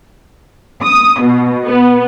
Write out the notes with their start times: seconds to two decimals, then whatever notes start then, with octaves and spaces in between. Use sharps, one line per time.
0.83 D#6
1.20 B2
1.65 B3